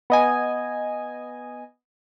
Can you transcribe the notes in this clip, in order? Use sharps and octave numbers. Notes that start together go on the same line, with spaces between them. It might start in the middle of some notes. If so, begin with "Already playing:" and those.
B3 D#5 G#5